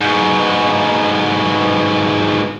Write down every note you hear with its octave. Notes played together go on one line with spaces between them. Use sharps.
G#2 B2